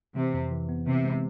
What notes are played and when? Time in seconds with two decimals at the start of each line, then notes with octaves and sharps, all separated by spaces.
0.16 C3 E3
0.34 F2
0.51 E3
0.69 B3
0.86 C3 E3
1.04 G#3